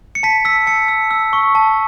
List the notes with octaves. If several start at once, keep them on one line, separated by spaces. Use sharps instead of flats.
C#7
A5 B6
E6 B6
A5 C#7
E6
E6
C#6
A5